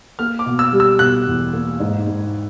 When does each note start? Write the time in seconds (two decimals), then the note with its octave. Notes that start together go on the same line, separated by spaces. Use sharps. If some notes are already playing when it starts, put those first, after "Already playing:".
0.19 A#3 F6
0.39 D6
0.46 B2
0.59 E6
0.73 G3
0.80 E6
0.99 B2 F#6
1.27 E2
1.53 A#3
1.80 G#2
2.07 G#2